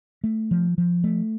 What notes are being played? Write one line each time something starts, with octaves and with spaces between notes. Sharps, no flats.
A3
F3
F3
A3